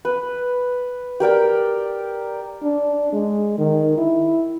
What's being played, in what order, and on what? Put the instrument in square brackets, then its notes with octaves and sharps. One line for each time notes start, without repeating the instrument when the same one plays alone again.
[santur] B4
G4 A#4 D5 G5
[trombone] D4
G#3
D#3
E4